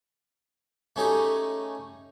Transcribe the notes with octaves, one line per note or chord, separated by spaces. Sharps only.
A3 C#4 D#4 G4 G#4